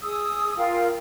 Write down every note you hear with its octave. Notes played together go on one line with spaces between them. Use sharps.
G#4 D#6 E6
F4 A#4 F5 G5